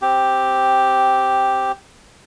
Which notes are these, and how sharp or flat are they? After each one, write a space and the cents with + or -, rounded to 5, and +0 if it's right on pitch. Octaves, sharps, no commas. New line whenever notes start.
C4 +0 G4 +0